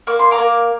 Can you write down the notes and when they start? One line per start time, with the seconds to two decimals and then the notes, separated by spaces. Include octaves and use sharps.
0.07 A#3 D6
0.19 C6
0.31 A#5 D6
0.38 A#3